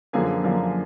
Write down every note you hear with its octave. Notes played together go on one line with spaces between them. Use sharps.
F#2 D3 F3 A#3 G#4 G#5
F#2 D3 F3 A#3